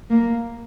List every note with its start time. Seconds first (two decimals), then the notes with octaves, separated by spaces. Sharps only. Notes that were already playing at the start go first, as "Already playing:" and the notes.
0.10 A#3